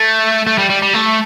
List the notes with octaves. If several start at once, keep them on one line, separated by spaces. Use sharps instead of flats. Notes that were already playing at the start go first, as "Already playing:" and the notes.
Already playing: A3
A3
G3
G3
G3
A3